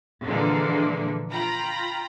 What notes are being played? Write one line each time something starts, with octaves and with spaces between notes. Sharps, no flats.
A#2 D3 E3 F3 G#3 A#3
F4 G5 A#5 B5